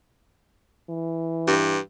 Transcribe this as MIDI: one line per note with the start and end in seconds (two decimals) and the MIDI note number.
0.90 1.79 52
1.47 1.79 43